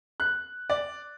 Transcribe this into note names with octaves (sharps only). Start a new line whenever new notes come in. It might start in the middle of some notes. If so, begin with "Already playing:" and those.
F#6
D5